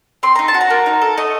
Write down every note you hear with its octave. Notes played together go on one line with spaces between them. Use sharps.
C4 C6
D#4 A#5
A5
F#4
A#5
A#3
D#4
A4
A3 D#5